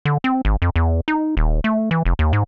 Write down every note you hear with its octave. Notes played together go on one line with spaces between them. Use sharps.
D3
C4
G#1
F2
E2
D#4
D#1
A3
E3
F1
D#2
G#2